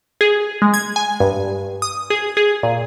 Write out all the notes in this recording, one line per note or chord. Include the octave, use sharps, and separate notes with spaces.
G#4
G#3
G#6
G#5
G2
D#6
G#4
G#4
A#2